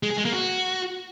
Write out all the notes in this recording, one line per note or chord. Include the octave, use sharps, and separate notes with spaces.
G#3
G#4
G#3
A#3
F#4